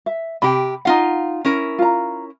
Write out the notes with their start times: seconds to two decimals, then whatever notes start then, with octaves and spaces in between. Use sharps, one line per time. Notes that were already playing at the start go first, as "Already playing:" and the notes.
0.06 E5
0.42 C3 G4 G5 B5
0.85 D#4 F4 F5 F#5 A#5
1.45 C#4 E4 A#4
1.79 F4 A#5